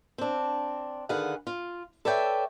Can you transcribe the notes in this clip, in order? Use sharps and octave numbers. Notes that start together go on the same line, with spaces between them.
C4 D4
D3 D#3 G#4 B4 F5 F#5
F4
A4 B4 C#5 D5 E5 G5